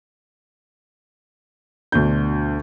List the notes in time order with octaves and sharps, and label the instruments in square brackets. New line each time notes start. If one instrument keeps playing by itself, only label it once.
[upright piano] D2 B2 D4 G6